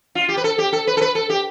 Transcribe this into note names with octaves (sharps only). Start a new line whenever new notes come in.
F4
G4
B4
A4
G4
A4
B4
A4
B4
A4
G4